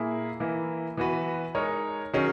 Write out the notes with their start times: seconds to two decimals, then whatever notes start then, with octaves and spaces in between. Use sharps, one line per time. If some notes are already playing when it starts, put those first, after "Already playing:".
Already playing: A#2 A#3 E4 G#4
0.40 E3 A#3 E4
0.97 E3 B3 F#4 B4
1.55 G#3 D#4 A#4 C#5
2.14 D#3 F#3 C#4 G#4